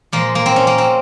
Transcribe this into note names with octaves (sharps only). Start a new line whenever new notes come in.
A#2 F3 G#3 A#3
A#3
C4
C#4
A#3
C4